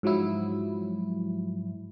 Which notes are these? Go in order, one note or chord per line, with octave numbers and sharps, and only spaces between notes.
G#2 F3 F#3 E4